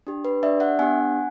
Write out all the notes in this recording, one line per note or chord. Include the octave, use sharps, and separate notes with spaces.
D4 G4
B4
D4 G4 D5 E5
E5 F#5
B3 D4 G4 F#5 G#5